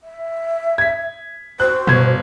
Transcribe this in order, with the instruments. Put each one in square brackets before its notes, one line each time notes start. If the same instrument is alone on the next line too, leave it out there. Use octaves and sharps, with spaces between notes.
[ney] E5
[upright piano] G#6 B6
[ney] F#4 [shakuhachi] C5 [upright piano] F#6
[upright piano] G1 G#6 [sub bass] B2